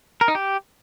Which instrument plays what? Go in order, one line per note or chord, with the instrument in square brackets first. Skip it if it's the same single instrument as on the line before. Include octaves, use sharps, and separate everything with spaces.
[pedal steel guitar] A#4
D#4
G4